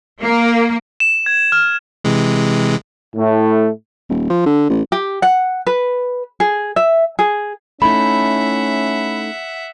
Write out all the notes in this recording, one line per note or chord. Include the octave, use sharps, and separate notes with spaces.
A#3
E7
G#6
F6
C3 E3 G#3
A2 A3
D#1
F3
D3
A1
G4
F#5
B4
G#4
E5
G#4
A3 C#4 D#4 E4 E5 F#5 B5